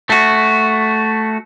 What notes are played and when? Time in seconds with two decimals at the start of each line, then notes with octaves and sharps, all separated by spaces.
0.10 A3 F#4